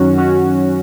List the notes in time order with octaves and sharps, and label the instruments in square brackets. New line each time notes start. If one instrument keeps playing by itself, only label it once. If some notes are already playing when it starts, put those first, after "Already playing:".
Already playing: [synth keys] F#2 D#3 F#3 C#4 F#4
F#2 D#3 F#3 C#4 F#4